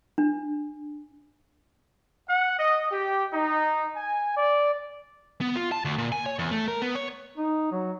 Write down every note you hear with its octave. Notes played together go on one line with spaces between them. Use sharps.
D4
F#5
D#5
G4
D#4
G#5
D5
B3
F4
A5
D2
A#2
G#5
C#5
E2
A3
A#4
B3
C#5
D#4
F#3